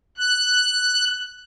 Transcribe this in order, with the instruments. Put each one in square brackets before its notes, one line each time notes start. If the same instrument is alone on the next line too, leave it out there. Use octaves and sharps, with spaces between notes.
[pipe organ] F#6